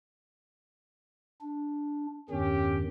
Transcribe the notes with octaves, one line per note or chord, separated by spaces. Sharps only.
D4
E2 G2 D#3 C#4 G4